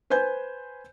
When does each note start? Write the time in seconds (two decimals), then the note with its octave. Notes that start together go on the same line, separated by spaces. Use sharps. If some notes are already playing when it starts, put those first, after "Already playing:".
0.10 B4 C5 G#5 G6